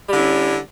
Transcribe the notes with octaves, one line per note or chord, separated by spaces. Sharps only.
D3 G3 C#4 E4